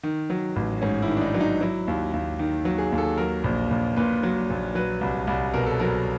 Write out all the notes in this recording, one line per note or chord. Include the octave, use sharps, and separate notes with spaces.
D#3
F#3
A1
G#2 C#4
E4
D#3
D4
D#4
F#3 D4
D#4
F#3 E4
D#2
D#2
D#3
F#3
G#4
D#2
A4
F#3 A#4
A#1
A#1
A#2 B4
F#3
A#1
F#3 B4
C2
C2
B2 A#4
A4
F#3 A#4